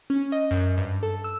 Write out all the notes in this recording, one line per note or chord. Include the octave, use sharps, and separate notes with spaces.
C#4
D#5
F#2
G2
A4
E6